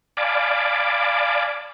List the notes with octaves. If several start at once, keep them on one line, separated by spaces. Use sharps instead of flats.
D5 F5 G#5 A5 B5 D6